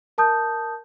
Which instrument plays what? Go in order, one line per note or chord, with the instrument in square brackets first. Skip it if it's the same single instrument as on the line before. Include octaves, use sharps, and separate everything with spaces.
[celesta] A#4 A5 D#6 G6